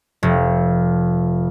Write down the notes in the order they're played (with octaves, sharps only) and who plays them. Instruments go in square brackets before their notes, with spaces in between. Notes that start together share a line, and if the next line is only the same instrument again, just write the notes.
[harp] F1